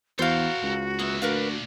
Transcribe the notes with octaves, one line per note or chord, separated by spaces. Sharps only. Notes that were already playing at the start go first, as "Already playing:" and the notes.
E2 F#4 A4 A#4 C5 F5
C#2
A#3 B3 E5
D2 A#2 D4 A#4 B4 F5